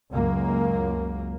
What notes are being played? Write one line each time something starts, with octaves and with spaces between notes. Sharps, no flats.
C#2 F#2 A#3